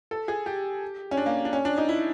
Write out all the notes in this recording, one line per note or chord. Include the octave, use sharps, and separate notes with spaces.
A4
G#4
G4
C#4
D4
A#3
D4
C#4
D4
D#4
E4